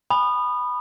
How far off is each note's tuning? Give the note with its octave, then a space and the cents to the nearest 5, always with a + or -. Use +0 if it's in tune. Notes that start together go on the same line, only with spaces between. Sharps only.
G#5 -20 B5 +0 D#6 -25